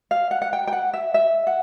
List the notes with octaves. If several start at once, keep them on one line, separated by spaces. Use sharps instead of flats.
F5
F#5
F#5
G5
G5
F#5
E5
E5
F#5